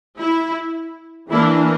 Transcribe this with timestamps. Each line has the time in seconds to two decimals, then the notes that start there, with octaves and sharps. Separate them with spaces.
0.19 E4
1.31 E3 A#3 D4 E4